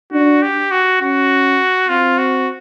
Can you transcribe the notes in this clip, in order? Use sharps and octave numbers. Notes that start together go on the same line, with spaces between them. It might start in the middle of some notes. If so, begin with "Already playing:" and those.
D4 F#4
G4
F#4
C#4 F#4
C4 F4
F#4